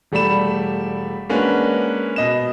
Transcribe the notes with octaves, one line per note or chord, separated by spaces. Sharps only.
E1 G3 A3 D5 B5 E7
G#3 A#3 C#4 D4 F#4 B4
B2 D#5 E7